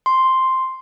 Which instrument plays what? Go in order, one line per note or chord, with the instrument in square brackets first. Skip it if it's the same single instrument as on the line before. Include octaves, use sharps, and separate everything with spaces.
[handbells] C6